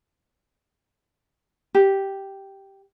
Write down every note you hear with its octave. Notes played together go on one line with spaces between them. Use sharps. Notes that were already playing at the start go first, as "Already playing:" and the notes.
G4